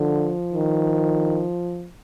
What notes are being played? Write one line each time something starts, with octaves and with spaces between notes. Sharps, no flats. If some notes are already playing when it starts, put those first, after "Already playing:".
Already playing: D3 F3
D#3